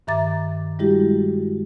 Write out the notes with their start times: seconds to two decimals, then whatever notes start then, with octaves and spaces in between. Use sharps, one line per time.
0.07 G2 D#3 E5 A#5 D6 A6
0.79 G3 G#3 E4 F#4 G4